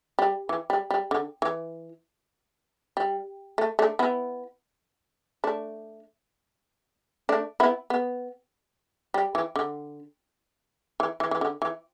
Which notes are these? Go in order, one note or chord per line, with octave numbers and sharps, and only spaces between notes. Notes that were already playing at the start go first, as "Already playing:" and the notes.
G3
E3
G3
G3
D3
E3
G3
A3
A3 D4
B3 E4
A3 D4
A3 D4
B3 E4
B3
G3
E3
D3
E3
E3
E3
D3
E3